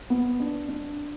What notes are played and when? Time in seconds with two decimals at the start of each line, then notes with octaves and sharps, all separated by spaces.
0.10 B3
0.40 D4
0.69 D4